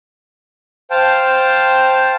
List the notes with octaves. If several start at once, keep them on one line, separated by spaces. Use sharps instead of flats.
C5 F5 G5 A5